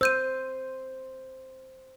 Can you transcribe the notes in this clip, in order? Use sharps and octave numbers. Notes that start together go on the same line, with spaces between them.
C5 E6 G6 D#7